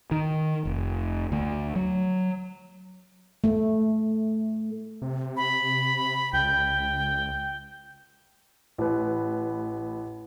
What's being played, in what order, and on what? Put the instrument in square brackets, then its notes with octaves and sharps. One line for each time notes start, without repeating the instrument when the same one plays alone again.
[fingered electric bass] D#3
F1
D2
F#3
[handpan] A3
[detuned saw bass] C3
[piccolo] B5
[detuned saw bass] C#2 [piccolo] G5
[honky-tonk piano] A1 B4